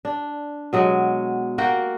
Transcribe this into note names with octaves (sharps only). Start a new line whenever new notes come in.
D4
B2 F#3 G#3
A#3 F#4 F#5 G5